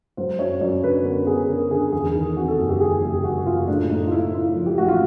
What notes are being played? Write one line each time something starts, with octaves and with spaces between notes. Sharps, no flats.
F#3 C5
F#2 C#5
F#2 D5
D3 B4
B3 A#4
B3 G#4
D3 A#4
D3 G#4
E2 G#4
D#3
C3 F#4
A4
F#1
G4
D#3 G#4
F#1 G4
F#1 F#4
F#1 F4
A2 D4
A3 D#4
F4
A3 E4
A3 F4
F3
G4
A1 F#4
F4